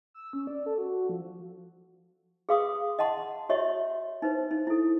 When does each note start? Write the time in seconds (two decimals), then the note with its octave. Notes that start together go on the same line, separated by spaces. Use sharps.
0.14 E6
0.33 C#4
0.47 D5
0.66 A4
0.78 F#4
1.09 F3
2.49 G#4 B4 F5 C6 D6 D#6
2.99 D#5 F#5 A5 C6
3.49 F#4 G4 C#5 D#5 E5 C6
4.22 D#4 B4 C5
4.51 D#4
4.67 E4 A4